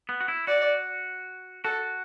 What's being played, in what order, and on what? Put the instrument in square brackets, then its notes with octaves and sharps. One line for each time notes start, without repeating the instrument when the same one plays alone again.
[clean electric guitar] B3
F#4
E4
[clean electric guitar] F#4 [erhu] D5
[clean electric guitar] F#4 [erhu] A4